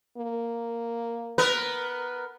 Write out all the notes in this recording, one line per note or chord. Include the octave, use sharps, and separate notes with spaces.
A#3
B3 A#4 B4